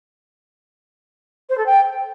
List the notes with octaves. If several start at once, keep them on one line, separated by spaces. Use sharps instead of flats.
C5
A4
G5